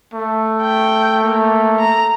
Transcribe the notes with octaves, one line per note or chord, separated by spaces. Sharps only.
A3
G5
A#3
A#5